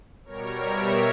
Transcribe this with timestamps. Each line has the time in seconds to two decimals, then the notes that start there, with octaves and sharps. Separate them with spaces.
0.25 B2 G3 A#4 C#5
0.65 C#5 E5